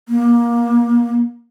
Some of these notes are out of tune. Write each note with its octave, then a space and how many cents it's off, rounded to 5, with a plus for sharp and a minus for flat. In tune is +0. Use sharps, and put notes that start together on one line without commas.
A#3 +25